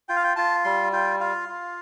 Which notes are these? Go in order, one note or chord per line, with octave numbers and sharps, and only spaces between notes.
F4 G5
F5
G5
F4 A5
G3 C6
F4 G5
F4 F5
F4